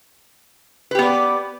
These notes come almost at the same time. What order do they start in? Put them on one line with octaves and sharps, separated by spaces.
B4 G4 B3 D5